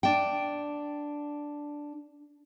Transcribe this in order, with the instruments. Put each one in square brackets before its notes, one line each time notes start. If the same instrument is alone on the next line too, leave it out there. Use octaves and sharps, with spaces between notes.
[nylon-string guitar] D4 G5